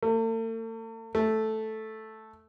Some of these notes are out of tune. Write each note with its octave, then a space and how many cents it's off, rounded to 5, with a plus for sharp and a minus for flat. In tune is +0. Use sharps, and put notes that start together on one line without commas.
A3 +45
A3 -5